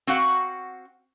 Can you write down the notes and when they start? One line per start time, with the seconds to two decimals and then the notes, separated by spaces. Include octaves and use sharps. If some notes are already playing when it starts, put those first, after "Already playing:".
0.07 C4 F#4 F5 F#5